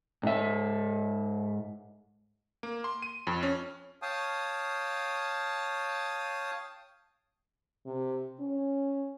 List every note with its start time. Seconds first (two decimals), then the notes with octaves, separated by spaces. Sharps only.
0.23 G#2 E5
2.63 A#3
2.84 C6
3.02 D#7
3.27 F2
3.43 C#4
4.02 C#5 F5 G5 A5 D#6
7.86 C3
8.40 C#4